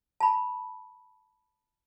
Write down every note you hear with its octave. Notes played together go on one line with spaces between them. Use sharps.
A5 B5